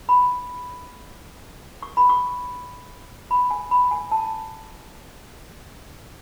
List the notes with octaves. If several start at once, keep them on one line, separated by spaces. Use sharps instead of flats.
B5
C#6
B5
C#6
B5
G#5
B5
G#5
A5